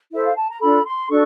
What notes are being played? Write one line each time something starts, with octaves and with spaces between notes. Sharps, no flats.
E4 A4 C5 E5
F5
A5
A#5
D4 F4 A4 B5
C6
D4 F#4 A4 C#6